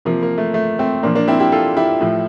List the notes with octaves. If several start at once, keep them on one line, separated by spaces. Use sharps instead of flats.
C3 F3 A#3
A#3
A3
A3
A3 C4
A#2 F3 A#3 D4
A#3 D4
C4 E4
E4 G4
F4 A4
E4 G4
A2 F3